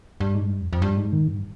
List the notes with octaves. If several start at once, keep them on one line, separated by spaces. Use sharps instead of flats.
G2
G#2
G2
F2
F2
G2
G#2
D#3
G2